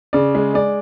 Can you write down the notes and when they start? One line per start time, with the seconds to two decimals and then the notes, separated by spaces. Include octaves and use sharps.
0.13 C#3 D5
0.35 G#3
0.54 G#3 D5